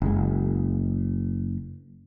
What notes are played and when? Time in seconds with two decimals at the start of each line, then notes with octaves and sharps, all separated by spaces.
0.02 F#1 G#3